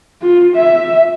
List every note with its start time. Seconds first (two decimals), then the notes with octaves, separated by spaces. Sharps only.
0.22 F4
0.56 E5